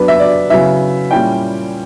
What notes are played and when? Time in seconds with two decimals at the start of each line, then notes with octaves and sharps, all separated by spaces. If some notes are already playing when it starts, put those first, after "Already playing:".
Already playing: F#3 B3 D4 B4
0.08 E5
0.20 D5
0.50 C#3 F#3 B3 E4 E5
1.11 A#2 G3 C#4 E4 G5